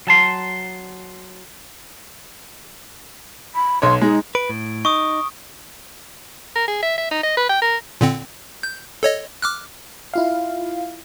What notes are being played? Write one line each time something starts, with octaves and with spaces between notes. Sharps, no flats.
F#3 A5 C6
B5
B1 C#5 C6
G#3 D#4
B4 D7
A2
D#4 C#6 D#6
A#4
G#4
E5
E5
D#4
D#5
B4
G5
A#4
A#2 D3 C4
G6
A4 C#5 D#5
D6 F6 F#6
E4 F4 F5